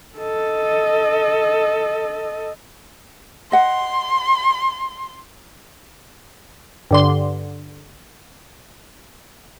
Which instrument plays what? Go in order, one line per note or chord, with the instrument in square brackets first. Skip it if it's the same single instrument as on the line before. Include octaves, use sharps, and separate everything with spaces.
[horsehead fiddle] A4 D#5
[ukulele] D#5 F#5 [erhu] C6
[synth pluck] G2 D3 C6